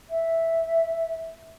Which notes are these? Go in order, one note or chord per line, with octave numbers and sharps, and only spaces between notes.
E5